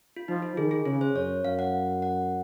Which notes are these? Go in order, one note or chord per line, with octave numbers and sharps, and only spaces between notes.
F4
F3 D#4
F4
D#3 G#4
G#4
C#3 G#4
C5
F#2 C#5
F#2 F5
F#5
F#5